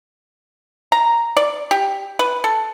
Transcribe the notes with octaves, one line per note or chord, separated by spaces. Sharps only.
A#5
D5
G4
B4
A4